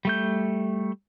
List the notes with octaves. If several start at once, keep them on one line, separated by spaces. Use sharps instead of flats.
G3 A3 G6